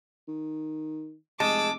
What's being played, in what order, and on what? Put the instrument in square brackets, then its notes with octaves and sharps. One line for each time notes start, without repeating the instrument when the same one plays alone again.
[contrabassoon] D#3
[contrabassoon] F1 [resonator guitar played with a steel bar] G#3 [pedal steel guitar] A5 [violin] D6 E6